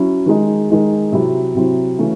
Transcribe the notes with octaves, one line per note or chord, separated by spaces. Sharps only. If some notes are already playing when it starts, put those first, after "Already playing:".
Already playing: F#3 C#4 E4
D#3 G#3 D#4
D#3 G#3 D#4
C3 F#3 C4 E4
C3 F#3 C4 E4
C#3 E3 A3 C#4